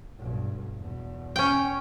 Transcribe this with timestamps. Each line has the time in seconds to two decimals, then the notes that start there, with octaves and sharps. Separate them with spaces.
0.18 B1 G2
0.76 E2 B2
1.36 C#4 G5